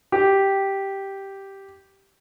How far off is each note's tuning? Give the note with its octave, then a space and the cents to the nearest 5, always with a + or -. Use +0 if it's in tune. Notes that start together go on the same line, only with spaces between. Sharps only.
G4 -5